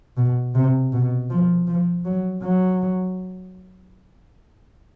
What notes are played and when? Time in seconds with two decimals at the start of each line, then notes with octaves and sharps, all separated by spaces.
0.17 B2
0.55 C3
0.92 B2
1.30 F3
1.67 F3
2.04 F#3
2.42 F#3